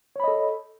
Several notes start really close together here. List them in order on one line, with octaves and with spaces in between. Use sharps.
C#5 B5 D#5 A4